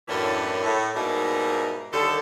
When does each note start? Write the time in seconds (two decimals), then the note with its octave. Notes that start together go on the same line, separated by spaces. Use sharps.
0.08 F#2 A2 E3 A#3 C#4 D4
0.63 A2
0.95 G#2 B2 G3 A#3 D#4 E4
1.92 D#2 D3 D#3 G3 A4